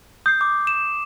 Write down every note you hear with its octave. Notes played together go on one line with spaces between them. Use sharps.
D#6 G6 C7
D6
E7